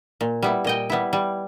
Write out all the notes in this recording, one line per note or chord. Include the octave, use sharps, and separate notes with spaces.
A#2
G3 B3 E4
A#2 D#5 G5
G3 B3 E4
G3